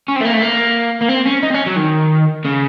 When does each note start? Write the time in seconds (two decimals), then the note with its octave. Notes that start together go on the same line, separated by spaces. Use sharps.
0.09 C#4
0.16 C4
0.21 A3
0.25 A#3
0.33 A3
0.42 A#3
1.02 A#3
1.09 C4
1.26 C#4
1.43 D#4
1.50 C4
1.54 C#4
1.66 F#3
1.76 D#3
2.45 C#3